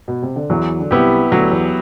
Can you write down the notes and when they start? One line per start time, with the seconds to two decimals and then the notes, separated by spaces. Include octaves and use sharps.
0.08 B2
0.22 C3
0.36 D3
0.50 E2 E3 F#3
0.80 D3
0.91 C2 C3 B3 E4 G4
1.31 D2 D3 F#3
1.51 E2 E3